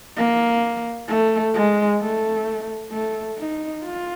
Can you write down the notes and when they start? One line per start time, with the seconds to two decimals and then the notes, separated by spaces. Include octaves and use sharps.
0.17 A#3
1.09 A3
1.54 G#3
2.00 A3
2.92 A3
3.38 D#4
3.84 F4